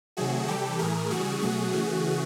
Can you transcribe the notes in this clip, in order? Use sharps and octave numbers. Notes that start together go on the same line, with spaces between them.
C3 D#3 F#3 A3 F#4 G#4
C3 E3 G3 G4 A4
A2 E3 A3 G#4 A#4
C#3 E3 G3 F#4 G#4
B2 F#3 A3 F#4 G#4
C#3 E3 A3